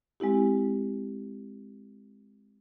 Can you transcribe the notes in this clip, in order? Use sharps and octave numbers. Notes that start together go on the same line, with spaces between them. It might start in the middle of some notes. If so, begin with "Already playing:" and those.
G#3 C4 E4 G4